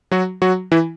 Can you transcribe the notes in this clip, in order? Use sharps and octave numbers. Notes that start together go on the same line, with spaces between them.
F#3 F#4
F#3 F#4
E3 E4